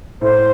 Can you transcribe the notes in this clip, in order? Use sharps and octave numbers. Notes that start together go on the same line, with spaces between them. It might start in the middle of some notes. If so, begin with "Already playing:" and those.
A2 C5